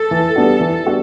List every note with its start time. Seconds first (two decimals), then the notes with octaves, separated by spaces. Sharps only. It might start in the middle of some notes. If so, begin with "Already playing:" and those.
Already playing: A4
0.11 E3
0.36 G3 B3 D4 F#4
0.60 E3
0.86 G3 B3 D4 F#4